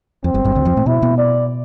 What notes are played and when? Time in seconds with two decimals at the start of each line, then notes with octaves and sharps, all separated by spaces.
0.24 F2 C4
0.34 G1 G2
0.45 G1 G2
0.55 D2 D3
0.65 F2 F3
0.77 A2 A3
0.86 B2 B3 E4
1.02 B2 B3
1.18 D5